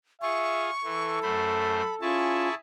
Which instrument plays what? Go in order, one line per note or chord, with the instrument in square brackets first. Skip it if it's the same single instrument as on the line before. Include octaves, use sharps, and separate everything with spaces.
[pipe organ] F4 G#4 [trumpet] E5 [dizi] C#6
[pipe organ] E3 [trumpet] A4
[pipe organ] F#2 A3 C5 [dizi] B5
[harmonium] C#4 F4 [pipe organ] E4 G#4 A5 [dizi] C#6